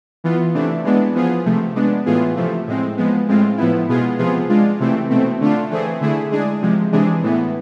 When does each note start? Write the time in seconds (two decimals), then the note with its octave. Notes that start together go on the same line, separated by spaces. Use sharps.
0.24 E3 B3 F4
0.54 C3 E3 A3 D4
0.84 E3 G#3 B3 D4
1.15 F3 B3 F4 G#4
1.45 C3 F3 A3
1.76 G#3 B3 D4
2.06 A2 E3 B3 F4 G#4
2.36 C3 F3 A3
2.67 A2 G#3 C4
2.97 F3 G#3 B3
3.28 A2 G#3 C4 F4
3.58 A2 F3 B3 E4
3.88 B2 G#3 B3 F4 G#4
4.18 C3 F3 B3 F4 G#4
4.49 G#3 D4 F4
4.80 C3 E3 A3 C4
5.10 B2 A3 C4
5.41 D3 A3 D4 F4
5.70 E3 A3 C4 G#4
6.01 D3 A3 E4 G#4
6.31 G#3 D4 G#4
6.62 C3 F3 G#3
6.92 C3 E3 G#3 D4 G#4
7.23 A2 E3 B3